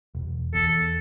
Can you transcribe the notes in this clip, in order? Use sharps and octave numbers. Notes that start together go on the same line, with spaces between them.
E1
E2 A4